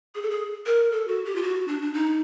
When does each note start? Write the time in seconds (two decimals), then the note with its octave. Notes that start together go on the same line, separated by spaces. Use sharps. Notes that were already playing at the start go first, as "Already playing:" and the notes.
0.15 G#4
0.22 A4
0.30 G#4
0.66 A#4
0.92 A4
1.08 F#4
1.25 G4
1.36 F4
1.42 F#4
1.68 D4
1.82 D4
1.94 D#4